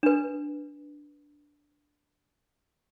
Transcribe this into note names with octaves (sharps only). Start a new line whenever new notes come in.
D4 B4